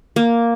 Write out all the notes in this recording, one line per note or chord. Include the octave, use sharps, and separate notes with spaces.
A#3